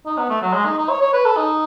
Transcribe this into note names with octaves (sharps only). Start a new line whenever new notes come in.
D#4
B3
A3
F#3
G#3
D#4
D#4
C#5
C#5
B4
A4
D#4